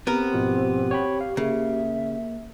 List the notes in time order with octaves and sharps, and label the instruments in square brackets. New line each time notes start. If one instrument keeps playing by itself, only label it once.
[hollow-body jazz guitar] B3 A#4 [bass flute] C4 [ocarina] G4
[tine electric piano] G#2 B2 F3
C#5 G5 B5
F5
[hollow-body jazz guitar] C#3 [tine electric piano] A#3 [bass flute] E5